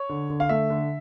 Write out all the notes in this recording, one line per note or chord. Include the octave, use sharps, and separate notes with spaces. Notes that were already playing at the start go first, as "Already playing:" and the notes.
Already playing: C#5
D3
D3
F5
A3 E5
D3